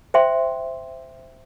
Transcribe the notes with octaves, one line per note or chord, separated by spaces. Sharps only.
C5 E5 G5 C6